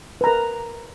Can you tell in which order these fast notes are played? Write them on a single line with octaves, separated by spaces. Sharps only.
B4 A#5 A#4